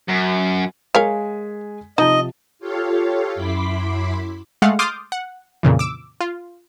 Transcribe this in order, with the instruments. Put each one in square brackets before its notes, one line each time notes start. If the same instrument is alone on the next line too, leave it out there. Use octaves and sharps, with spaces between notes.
[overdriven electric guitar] F#2
[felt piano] G#3 G#5 B6 [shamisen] A#4 C#5 F5
[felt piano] C3 F3 A5 [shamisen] D#4 [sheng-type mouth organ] D#5
[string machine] F4 G4 A4 C#5 F5
F#2 E4 B5 C6 D6 B6
[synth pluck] G#3 A3 F5 F#5
C6 D6 D#6 F6 G6 A6
F#5
F2 A#2 C#3 E3
D6 E6
F4